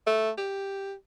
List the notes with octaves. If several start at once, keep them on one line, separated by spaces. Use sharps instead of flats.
A3
G4